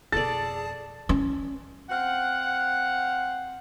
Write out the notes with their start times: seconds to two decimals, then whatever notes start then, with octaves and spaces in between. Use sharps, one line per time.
0.12 F2 B2 G#4 A4 D5 A5 A6
1.09 C#4
1.90 C4 F5 F#5